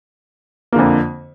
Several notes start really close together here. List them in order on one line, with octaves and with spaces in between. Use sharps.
A#3 D3 F2